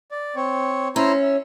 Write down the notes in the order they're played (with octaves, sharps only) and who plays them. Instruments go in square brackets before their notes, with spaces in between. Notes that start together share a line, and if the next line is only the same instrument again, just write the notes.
[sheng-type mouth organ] D5
C4 C#5
[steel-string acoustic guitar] C#4 [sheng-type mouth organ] E4 C5 A#5
[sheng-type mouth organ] E5